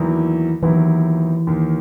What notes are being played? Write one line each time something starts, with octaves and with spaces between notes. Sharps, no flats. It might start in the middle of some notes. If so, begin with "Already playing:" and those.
Already playing: E2 D#3 E3 F#3 A#3 E4
D#2 D#3 E3 F#3 B3 E4
D#2 D#3 A#3